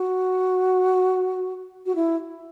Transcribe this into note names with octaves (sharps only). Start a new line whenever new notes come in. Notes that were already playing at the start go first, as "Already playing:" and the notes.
Already playing: F#4
F#4
E4